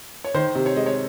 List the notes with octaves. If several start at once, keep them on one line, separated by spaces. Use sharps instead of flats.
C#5
D#3 C5
C3
C#5
G#3 D#5
C#5